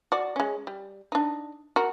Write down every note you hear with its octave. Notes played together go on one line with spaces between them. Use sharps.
F#4 D5
G#3 C#4
G3
D4 D#4
F#4 A#4